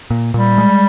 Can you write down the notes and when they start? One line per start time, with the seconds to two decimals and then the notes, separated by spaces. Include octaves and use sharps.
0.10 A#2
0.34 A#2 G3
0.58 G#3